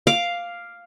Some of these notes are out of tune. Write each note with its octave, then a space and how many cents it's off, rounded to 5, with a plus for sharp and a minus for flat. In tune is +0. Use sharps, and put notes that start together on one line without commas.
F5 +0 D6 +0